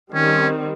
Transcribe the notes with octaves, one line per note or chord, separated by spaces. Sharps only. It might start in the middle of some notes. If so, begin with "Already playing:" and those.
D#3 G3 C4 C#4